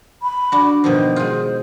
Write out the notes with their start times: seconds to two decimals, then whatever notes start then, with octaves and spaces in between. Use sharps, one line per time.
0.23 B5
0.52 D4 F#4
0.84 B2 D#3 F3 C5
1.16 G#3 F4